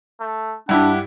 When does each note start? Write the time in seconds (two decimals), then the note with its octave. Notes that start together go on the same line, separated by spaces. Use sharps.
0.20 A3
0.69 G2 D4 E4 G4 F#5